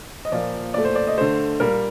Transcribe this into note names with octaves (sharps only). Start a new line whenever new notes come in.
D#5
A#2 F3 A#3 D5
A#2 A3 D5
C5
D5
D#5
D3 A3 C5
A#2 G3 A#3 A#4